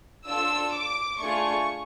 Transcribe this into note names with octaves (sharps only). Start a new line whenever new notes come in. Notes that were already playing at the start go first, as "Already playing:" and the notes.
D4 F4 A4 E6
D6
A3 D4 F4 G#4 C#6